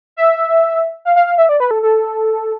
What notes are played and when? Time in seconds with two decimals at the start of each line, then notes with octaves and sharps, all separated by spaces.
0.16 E5
1.05 F5
1.16 F5
1.26 F5
1.38 E5
1.49 D5
1.60 B4
1.71 A4
1.83 A4